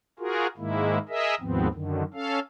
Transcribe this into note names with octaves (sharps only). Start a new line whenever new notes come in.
F4 F#4 G#4 A#4
G#2 D#3 G#3 A#3 E4
G#4 A#4 D#5 E5
D#2 G#2 F3 B3 C4
F#2 D3 D#3
C#4 A4 F5